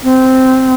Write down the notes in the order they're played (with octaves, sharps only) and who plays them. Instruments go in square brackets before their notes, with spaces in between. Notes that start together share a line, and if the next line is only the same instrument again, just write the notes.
[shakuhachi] C4